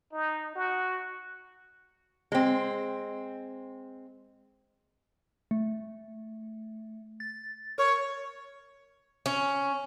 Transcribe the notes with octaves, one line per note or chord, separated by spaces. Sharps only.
D#4
F#4
G#3 C4
A3
A6
A#4 C#5
C#4